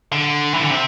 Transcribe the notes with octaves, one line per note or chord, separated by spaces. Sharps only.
D3
E3
D3
C3